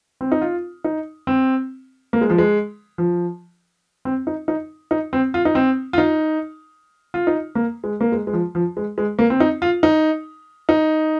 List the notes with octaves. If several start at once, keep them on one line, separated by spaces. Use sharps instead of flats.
C4
D#4
F4
D#4
C4
A#3
G#3
F3
G#3
F3
C4
D#4
D#4
D#4
C4
F4
D#4
C4
F4
D#4
F4
D#4
A#3
G#3
A#3
G#3
G#3
F3
F3
G#3
G#3
A#3
C4
D#4
F4
D#4
D#4